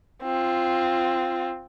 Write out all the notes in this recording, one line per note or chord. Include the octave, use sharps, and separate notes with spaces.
C4 F4